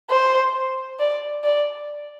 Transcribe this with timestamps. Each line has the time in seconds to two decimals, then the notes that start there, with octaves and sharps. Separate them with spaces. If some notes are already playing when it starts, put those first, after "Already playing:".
0.10 C5
1.00 D5
1.44 D5